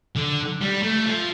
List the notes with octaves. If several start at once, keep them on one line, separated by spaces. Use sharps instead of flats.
D3
G3
A3
F3